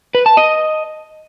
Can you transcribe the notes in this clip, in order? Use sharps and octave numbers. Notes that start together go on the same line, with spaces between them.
B4
A5
D#5